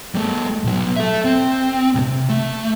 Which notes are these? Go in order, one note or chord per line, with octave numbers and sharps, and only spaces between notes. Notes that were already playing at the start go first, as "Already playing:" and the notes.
G3 A3
B2 F#3
A4 E5
C4
C2 C3
A3